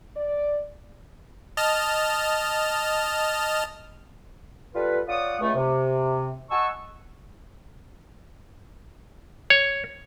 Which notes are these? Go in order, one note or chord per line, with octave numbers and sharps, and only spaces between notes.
D5
D#5 A5 F6
G3 F4 A4 B4
F4 C#5 D5 F#5 D#6
C#2 A3
C3
D#5 F#5 G#5 A5 C#6 E6
C#5